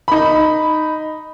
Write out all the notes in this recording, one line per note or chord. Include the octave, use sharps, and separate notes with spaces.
D#4 B5